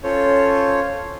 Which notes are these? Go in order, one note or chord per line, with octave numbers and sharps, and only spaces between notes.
C#4 F4 A4 C5 C#5